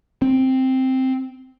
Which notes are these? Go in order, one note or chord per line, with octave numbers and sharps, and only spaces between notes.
C4